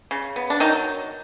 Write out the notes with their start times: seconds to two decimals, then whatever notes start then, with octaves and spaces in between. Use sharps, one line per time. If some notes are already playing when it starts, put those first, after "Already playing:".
0.11 C#3
0.36 B3
0.50 D4
0.60 D#3 F#3 D#4